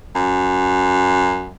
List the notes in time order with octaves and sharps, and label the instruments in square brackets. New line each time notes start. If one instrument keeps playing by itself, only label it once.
[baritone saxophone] F#2